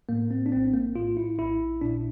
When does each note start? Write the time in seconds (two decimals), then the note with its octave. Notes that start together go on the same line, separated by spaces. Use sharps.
0.09 A2 A#3
0.31 C4
0.46 D4
0.52 A#1 C4
0.67 C4
0.73 A#3
0.95 A2 F4
1.17 E4
1.38 A#1 E4
1.81 A#2 D4